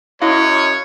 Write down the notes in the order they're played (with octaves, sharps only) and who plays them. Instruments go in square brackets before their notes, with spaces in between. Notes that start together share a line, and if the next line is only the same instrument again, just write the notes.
[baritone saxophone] F#2 [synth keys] E4 D#5 F5 [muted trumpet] C#5